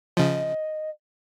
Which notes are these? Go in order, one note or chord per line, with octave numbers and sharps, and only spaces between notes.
C#3 F3 D#5